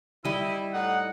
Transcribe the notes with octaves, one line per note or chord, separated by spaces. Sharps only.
G3 E4 D#5
A2 D#4 F#5